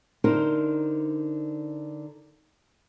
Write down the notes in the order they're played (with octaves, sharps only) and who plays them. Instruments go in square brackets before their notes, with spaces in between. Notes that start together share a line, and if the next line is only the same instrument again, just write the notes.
[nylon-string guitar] D3 D#4 E4 A#4 C5